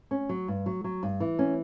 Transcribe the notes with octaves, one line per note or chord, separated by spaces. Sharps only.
C#4
F#3
G2
F#3
F#3
G2
E3
C#4